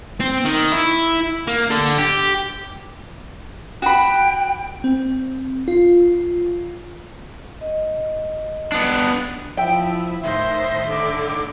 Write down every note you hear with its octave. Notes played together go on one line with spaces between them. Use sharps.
C4
D#3
E4
A#3
D3
G4
F#4 G5 B5
C4
F4
D#5
B3 D4
F3 E4 E5 G5
A2 D#3 C5 D#5 E5
D3 D6